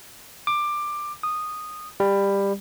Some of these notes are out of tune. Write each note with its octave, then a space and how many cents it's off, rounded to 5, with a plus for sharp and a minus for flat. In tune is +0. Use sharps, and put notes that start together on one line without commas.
D6 +15
D#6 -10
G3 +20